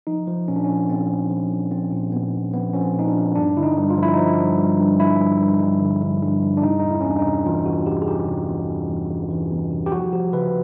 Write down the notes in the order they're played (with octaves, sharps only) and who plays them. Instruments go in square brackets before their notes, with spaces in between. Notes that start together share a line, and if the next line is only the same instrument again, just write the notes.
[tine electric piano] F3 D#4
F3
A#2 C#4
D4
F3 C#4
A#2 C4
F3
F3
F3
F3 C4
A#2
A#2 B3
A#2
F3 B3
F3 C#4
C4
A#2 D#4
D4
F3
G2 D4
D3 E4
D#4
G2
F4
F3
E4
F3 D#4
E4
G2
G2
G2
G2 E4
G2
G2
G2
D3
G2
G2
G2
D4
C3 D#4
E2 D#4
E4
E2 C#4
D4
D#4
C3
E3 F4
E2 F#4
C3 G4
G#4
C3 G4
C3
E2
E2
E2
E3
E3
E2
C3
G4
F3 F#4
F3 G4
C#3 B4